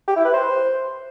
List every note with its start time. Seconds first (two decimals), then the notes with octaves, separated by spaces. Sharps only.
0.08 G4
0.16 E4
0.25 B4
0.34 C5